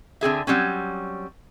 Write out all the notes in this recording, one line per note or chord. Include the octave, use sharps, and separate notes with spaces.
D3 C4 G#4 E5
F#3 G3 C4 C#4